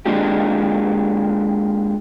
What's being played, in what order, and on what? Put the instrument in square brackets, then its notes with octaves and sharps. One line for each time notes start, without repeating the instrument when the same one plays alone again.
[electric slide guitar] G#3 A#3 D4 F4 G4